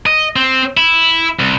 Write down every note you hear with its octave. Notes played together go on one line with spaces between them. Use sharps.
D#5
C4
E4
C2